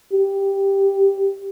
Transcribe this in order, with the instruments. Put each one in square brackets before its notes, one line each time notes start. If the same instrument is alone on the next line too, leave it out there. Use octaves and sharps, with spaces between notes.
[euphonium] G4